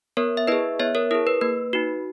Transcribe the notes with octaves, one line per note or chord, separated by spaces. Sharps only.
B3 A#4 C#5
E5
E4 G#4 B4 D#5
B3 C#5 E5
A#4 C#5
E4 G#4 A#4
B4
A#3 B4
D#4 F#4